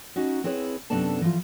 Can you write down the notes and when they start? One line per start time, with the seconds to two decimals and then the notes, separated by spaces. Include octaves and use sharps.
0.16 C#4 D#4 F#4
0.44 C4 E4 G#4 B4 C#5
0.90 F#2 C3 B3 D4 A4 A5
1.21 E3 F3 F4